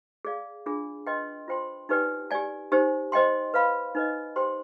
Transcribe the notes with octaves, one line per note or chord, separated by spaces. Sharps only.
G#4 D5 F5
D4 F4 G#4
B4 D#5 G5 C6
F4 C5 G5 C6
D#4 G4 B4 D5 G5
G4 D5 G#5
D#4 G4 C5
C5 D#5 G5 C6
B4 F5 B5
D#4 B4 D#5
G4 C5 G5 C6